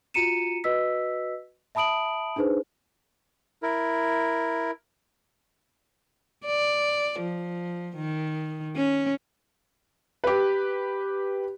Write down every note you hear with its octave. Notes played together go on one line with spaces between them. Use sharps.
F4 F#4 A#5 C#7 D#7 E7
F#4 B4 D#5 E6 B6
E5 A5 B5 D#6 D7 F#7
D4 D#4 G#4 B4 C5
E4 A#4
D5
F3
D#3
C#4
G4 B4